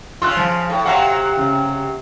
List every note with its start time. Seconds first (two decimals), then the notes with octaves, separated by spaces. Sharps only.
0.22 C#3 F4 C6 E6 F#6
0.37 F3
0.70 A2
0.86 C3 F#3 F5 F#5
1.37 C#3